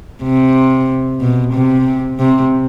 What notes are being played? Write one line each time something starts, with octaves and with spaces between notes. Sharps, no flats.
C3
B2
C3
C3